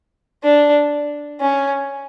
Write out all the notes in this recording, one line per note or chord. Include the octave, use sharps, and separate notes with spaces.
D4
C#4